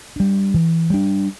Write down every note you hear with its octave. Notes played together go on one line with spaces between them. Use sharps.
G3 D4
E3
G3 D4